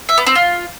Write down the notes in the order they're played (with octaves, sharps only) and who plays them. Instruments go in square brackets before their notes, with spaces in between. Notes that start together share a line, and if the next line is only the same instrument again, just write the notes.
[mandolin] E5
B3
C4
F4